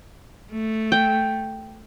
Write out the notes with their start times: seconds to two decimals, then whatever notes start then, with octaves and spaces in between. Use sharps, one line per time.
0.52 A3
0.92 G5